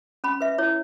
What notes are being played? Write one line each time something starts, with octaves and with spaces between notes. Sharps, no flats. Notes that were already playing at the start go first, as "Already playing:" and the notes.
C#4 B5
B4 E5
E4 C#5